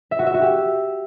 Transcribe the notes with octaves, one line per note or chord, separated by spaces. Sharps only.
E5
F#4
E5
F#4
G4